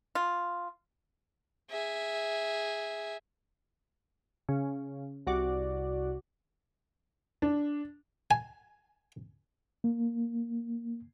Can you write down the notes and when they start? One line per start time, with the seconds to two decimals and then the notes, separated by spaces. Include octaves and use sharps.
0.15 F4
1.70 G#4 E5
4.49 C#3
5.27 C2 F#4 D5
7.42 D4
8.31 G#5
9.84 A#3